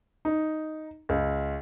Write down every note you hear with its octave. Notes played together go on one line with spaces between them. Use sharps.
D#4
C#2